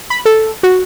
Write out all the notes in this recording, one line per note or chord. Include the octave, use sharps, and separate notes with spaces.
B5
A4
F#4